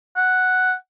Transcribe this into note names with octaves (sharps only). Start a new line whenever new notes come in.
F#5